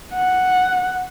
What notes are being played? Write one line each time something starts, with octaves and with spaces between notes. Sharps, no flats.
F#5